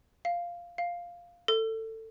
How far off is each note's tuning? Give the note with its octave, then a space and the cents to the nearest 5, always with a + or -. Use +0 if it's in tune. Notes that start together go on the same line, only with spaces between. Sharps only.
F5 -5
F5 +0
A4 +20